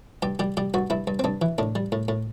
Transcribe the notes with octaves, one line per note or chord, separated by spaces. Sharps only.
G2 G4
G3 G4
G3 G4
G2 F#4
G2 E4
G2
C4
G2 D4
E3
A2 D4
G3
A2
A2